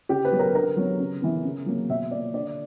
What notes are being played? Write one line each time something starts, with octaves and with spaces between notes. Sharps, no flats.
C#3 G4
B4
F#3 B3
A#4
D3 A#4
F#3 B3
C#3
E3 B3
C#3
F#3 A#3
B2 E5
A#3 D5
D3 D5